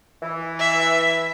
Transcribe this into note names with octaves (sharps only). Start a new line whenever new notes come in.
E3
E5